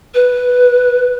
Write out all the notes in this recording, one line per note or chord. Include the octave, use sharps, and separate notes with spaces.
B4